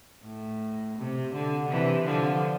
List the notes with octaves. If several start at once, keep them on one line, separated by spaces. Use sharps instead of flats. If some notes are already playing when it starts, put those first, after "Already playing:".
A2
C3
D3
C3 E3
D3 F3